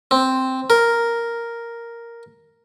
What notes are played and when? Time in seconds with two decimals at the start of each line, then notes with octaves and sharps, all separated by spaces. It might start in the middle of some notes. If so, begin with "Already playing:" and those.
0.11 C4
0.70 A#4